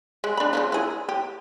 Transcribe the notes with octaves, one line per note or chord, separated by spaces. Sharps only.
G#3
D4 B5
C#3 E3 F3
E4 G#4
G4